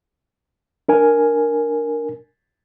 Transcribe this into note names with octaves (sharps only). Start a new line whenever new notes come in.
D4 A#4 G#5